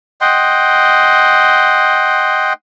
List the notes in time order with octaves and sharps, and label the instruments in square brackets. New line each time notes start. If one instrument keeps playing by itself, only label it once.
[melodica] D#5 F#5 G5 C6